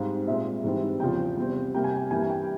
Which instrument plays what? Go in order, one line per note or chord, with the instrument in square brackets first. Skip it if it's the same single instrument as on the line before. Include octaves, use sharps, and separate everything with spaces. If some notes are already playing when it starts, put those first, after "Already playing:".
Already playing: [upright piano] G#2 G3 C4 F5
A#2 G#3 C4 E5
G#2 E3 G3 C4
E2 C#3 F3 G5
E2 C3 G3 C4
C3 G3 A#3 G5
G#5
G5
G2 E3 G3 A#3 G#5
G#5
G5